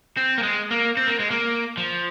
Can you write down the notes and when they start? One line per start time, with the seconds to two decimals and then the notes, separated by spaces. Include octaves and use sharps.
0.17 C4
0.38 A#3
0.43 G#3
0.71 A#3
0.97 C4
1.08 A#3
1.20 G#3
1.31 A#3
1.77 F3